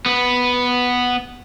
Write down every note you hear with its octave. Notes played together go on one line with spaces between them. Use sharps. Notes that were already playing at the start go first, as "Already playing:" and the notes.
B3